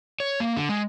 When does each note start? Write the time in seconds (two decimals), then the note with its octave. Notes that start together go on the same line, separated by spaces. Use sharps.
0.20 C#5
0.40 A#3
0.57 D3
0.69 G#3